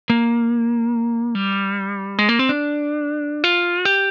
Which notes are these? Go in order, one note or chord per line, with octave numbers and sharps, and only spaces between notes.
A#3
G3
G#3
A#3
C4
D4
F4
G4